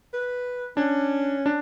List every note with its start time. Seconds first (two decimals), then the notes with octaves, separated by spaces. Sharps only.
0.14 B4
0.77 C#4 D4
1.46 D4